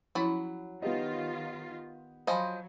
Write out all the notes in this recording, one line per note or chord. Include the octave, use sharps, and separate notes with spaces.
F3 F#3 C#4 E4 B5
D#3 B3 F4 G4 D#5
F3 F#3 C5 D#5 F5 G#5 B5